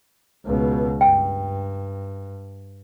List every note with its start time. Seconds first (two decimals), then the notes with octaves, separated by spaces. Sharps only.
0.46 C#2 B2
1.01 G2 G5